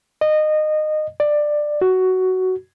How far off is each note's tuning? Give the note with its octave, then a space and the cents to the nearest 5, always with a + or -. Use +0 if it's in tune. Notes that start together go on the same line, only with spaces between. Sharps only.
D#5 -20
D5 +15
F#4 +10